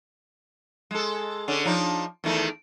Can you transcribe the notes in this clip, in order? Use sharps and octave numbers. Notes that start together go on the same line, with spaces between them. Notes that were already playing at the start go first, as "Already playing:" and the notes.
G#3 A4
D3 C#4
F3 D4 D#4
E2 D#3 A3